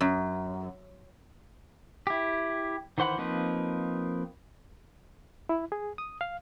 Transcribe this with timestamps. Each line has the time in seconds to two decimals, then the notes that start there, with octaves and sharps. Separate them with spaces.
0.01 F#2
2.07 E4 G4
2.98 D#3 E3 C5 F#5 B5
3.18 F3 A#3 C4 D#4 B4
5.49 E4
5.72 G#4
5.98 D#6
6.21 F5